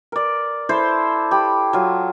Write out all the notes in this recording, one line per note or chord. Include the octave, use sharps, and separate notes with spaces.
A#4 D5
E4 A4 C5 A5
G4 B5
F#3 F4